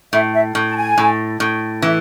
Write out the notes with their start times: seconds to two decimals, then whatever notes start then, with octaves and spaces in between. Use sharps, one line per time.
0.13 A2 E5
0.34 E5
0.55 A2
0.70 A5
0.76 G#5
0.98 A2
1.40 A2
1.82 E3 E5